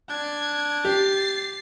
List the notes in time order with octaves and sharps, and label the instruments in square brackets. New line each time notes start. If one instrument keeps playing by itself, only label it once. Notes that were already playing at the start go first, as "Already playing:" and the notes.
[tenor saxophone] D4 [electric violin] G#6
[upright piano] G4 [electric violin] A6 C7